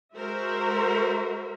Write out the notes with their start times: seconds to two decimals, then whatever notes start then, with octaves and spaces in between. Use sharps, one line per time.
0.16 G#3 F#4 A#4 C5 E5